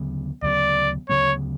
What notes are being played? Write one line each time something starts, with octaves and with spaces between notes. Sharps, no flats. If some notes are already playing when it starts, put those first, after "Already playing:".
Already playing: D2 C#3 F#3 B3
D2 C#3 F#3 B3 D5
D2 C#3 F#3 B3 C#5